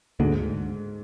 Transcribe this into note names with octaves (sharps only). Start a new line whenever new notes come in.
D2 G#2 D3